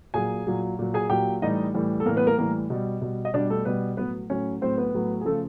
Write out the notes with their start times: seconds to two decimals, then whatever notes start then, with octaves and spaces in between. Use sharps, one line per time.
0.14 A#2 F#3 G#4 G#5
0.47 A#2 F#3
0.79 A#2 F#3
0.94 G#4 G#5
1.10 A#2 F#3 G4 G5
1.42 A2 E3 G3 D#4 D#5
1.74 A2 E3 G3
2.00 A4
2.06 A2 E3 G3 A#3 A#4
2.16 B3 B4
2.27 A#3 A#4
2.38 A2 E3 G3 A#3 A#4
2.70 B2 G3
3.01 B2 G3
3.25 D#5
3.34 B2 G3 D4 D5
3.50 A3 A4
3.65 B2 G3 B3 B4
3.97 A2 F#3 B3 B4
4.30 A2 F#3 C#4 C#5
4.61 A2 F#3 C4 C5
4.77 B3 B4
4.94 A2 F#3
5.21 G#4
5.25 C#3 F3 A3 A4